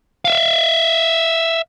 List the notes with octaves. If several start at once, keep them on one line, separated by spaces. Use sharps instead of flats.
E5 F5